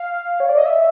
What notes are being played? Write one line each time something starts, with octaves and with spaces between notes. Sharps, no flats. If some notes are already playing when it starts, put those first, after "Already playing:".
Already playing: F5
C#5
D5
D#5
E5